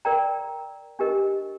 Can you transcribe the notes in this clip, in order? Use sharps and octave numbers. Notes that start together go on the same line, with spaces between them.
A#4 D5 G5 A#5
D4 G4 A#4 D#5